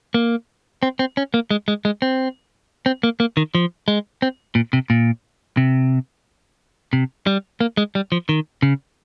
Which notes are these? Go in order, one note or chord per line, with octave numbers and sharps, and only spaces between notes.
A#3
C4
C4
C#4
A#3
G#3
G#3
G#3
C4
C4
A#3
A#3
D#3
F3
G#3
C4
A#2
C3
A#2
C3
C3
G3
A#3
G#3
G3
F3
D#3
C#3